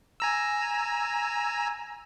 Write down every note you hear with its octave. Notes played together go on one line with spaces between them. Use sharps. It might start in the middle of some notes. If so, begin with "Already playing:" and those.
G#5 A#5 E6